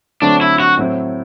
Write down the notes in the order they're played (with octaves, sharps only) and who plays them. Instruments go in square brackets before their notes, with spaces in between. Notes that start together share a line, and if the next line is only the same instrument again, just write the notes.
[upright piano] D3 F#3 A3 C4 [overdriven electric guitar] D4
[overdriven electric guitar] E4
F#4
[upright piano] A2 F#3 C4 E4